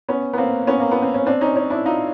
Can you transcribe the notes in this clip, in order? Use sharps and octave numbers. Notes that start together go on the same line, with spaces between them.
B3 C#4
B3
A#3 C4
B3 C#4
A#3
B3
C4
C#4
C4 D4
C#4 D#4
C#4 D#4
D4 E4
D#4 F4